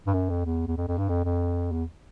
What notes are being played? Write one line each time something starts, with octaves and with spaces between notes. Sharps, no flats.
G2
F#2
F2
E2
E2
F2
F2
G2
F2
F2
E2